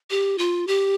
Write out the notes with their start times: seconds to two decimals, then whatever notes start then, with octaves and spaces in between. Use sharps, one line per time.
0.10 G4
0.38 F4
0.67 G4